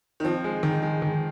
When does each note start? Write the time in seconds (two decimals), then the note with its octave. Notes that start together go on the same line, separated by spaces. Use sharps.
0.20 D#3
0.24 F3 C4
0.44 G#3
0.63 D#3
0.82 G#3
1.02 D#3